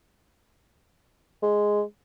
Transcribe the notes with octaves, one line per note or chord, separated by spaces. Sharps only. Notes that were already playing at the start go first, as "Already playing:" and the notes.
G#3